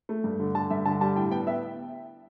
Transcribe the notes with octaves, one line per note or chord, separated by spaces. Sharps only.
A3
G2
D3
D3 A5
G2 E5
D3 A5
G3 A5
A2 G5
B3 G5
B3 E5